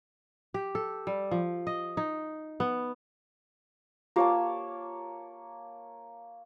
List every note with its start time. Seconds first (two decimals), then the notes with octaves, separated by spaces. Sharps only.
0.54 G4
0.75 A4
1.07 G3
1.31 F3
1.67 D#5
1.97 D#4
2.60 B3
4.16 A#3 F4 G4 C#5 A5